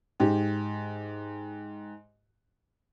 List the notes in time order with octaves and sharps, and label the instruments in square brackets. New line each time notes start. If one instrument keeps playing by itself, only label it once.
[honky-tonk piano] G#2 G4